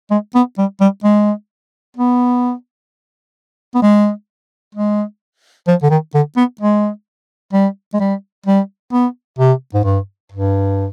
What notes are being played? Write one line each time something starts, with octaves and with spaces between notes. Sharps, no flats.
G#3
B3
G3
G3
G#3
B3
B3
G#3
G#3
F3
D3
D#3
D3
B3
G#3
G3
G#3
G3
G3
B3
C3
G#2
G2
G2